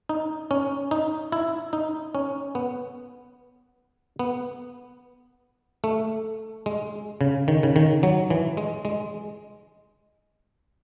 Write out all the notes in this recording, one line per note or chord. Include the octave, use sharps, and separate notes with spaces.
D#4
C#4
D#4
E4
D#4
C#4
B3
B3
A3
G#3
C#3
D#3
C#3
D#3
F#3
E3
G#3
G#3